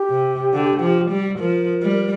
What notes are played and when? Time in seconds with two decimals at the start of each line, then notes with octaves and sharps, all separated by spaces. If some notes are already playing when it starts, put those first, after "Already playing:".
Already playing: G4
0.10 C3
0.53 D3
0.81 F3
1.11 G3
1.39 F3 A#4
1.82 G3